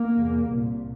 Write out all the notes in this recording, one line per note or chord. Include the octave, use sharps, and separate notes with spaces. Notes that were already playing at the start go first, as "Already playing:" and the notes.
Already playing: A#3
E2 C3
C2 A#2